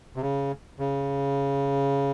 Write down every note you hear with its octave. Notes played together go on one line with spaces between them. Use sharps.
C3
C#3
C#3